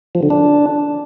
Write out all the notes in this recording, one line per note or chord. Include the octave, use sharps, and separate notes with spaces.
F3
D3
D4